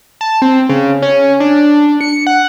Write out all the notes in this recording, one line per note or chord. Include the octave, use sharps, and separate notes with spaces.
A5
C4
C#3
C#4
D4
C#7
F#5